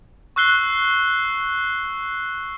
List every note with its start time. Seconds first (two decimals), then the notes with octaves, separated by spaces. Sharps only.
0.36 C#6 E6 F#6 C7 G7